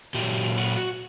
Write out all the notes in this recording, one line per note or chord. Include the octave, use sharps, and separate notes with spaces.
A#2 F#3 G4
F#4